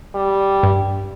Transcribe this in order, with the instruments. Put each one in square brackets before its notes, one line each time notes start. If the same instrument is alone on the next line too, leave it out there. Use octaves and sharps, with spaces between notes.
[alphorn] G3
[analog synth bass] G2